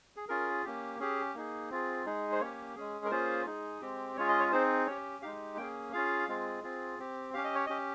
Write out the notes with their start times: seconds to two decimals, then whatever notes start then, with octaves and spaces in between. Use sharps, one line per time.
0.16 G#4
0.29 C#4 F4 G#4 A#4
0.65 A#3 C#4 G4
1.00 C#4 G4 G#4
1.35 A#3 D#4 G#4
1.70 C4 F4 G#4
2.06 G#3 D#4 G#4
2.32 C5
2.40 A#3 C#4 G4 C#5
2.76 G#3 C#4 G#4
3.05 A#4
3.11 A#3 C#4 F4 G#4 C5
3.46 G#3 D#4 G#4
3.82 G#3 C4 G4
4.17 G#3 C#4 F4 G#4 C#5
4.28 D#5
4.39 C#5
4.52 C4 D#4 G#4 C5
4.87 C#4 G4 C#5
5.22 G#3 D#4 G4 F5
5.57 A#3 C#4 G#4 G5
5.93 C#4 F4 G#4 F5
6.28 G#3 C4 F4 G#4
6.64 C4 F4 G#4
6.99 C4 G4
7.33 C#4 G4 F5
7.44 D#5
7.55 C#5
7.66 C#4 G4 D#5